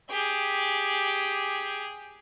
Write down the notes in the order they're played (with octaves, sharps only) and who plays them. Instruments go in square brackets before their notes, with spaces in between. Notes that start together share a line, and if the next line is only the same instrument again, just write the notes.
[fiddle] G4 G#4